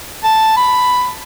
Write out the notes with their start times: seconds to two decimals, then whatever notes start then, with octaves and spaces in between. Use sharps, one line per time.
0.24 A5
0.57 B5